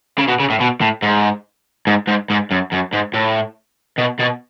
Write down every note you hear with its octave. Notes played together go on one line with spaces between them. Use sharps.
C#3
B2
C#3
A2
B2
A2
G#2
G#2
G#2
G#2
F#2
F#2
G#2
A2
B2
B2